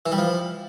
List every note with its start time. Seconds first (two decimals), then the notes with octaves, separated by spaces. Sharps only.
0.06 E3
0.12 G3
0.18 F3